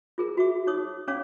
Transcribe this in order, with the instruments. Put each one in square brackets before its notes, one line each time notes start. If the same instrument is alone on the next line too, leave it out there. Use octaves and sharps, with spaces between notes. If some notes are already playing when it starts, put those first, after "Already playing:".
[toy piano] F4 G#4 A#4
F#4 E5 D6
D#4 C#5 D6 D#6
C#4 D4 C#5 F5 D6